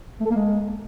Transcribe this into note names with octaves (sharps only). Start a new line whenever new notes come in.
A3
A4
A#3
G#3